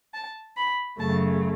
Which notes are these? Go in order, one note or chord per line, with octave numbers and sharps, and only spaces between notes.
A5
B5
F#2 C#3 A3 A5